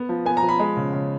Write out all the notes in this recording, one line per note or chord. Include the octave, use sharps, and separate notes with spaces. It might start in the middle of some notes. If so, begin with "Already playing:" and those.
Already playing: B3
F3
B3 G#5
A#5
F3
B5
G#3
C#3
C#3